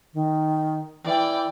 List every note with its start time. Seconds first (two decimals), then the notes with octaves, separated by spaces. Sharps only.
0.14 D#3
1.04 E3 D5 G5